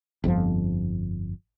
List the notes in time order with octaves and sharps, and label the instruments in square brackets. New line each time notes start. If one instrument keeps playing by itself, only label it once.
[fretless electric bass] G1 F2 D3 F3